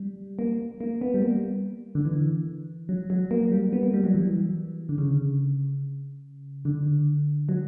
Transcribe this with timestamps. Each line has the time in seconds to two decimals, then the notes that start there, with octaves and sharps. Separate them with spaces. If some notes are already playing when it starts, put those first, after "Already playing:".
Already playing: G3
0.39 A#3
0.80 A#3
1.01 B3
1.14 G3
1.22 A#3
1.95 D3
2.05 E3
2.89 F#3
3.10 F#3
3.31 A#3
3.52 G3
3.73 B3
3.83 A#3
3.94 G3
4.04 F#3
4.14 E3
4.89 D3
4.98 C#3
6.65 D3
7.49 F#3